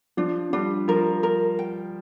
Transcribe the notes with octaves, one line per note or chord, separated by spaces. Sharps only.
F3 D4
G3 D4
F3 A#4
A#4
G5